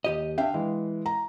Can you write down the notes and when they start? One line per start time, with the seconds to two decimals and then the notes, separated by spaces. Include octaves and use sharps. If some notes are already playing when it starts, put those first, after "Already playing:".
0.04 D#2 G4 D#5
0.38 D4 E5 F5 G5
0.54 E3 G#3
1.06 A#5